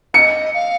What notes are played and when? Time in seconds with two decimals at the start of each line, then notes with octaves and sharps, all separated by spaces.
0.14 D#5 F5 C#7
0.54 F5